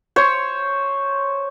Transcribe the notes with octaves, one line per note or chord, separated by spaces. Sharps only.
C5 C#5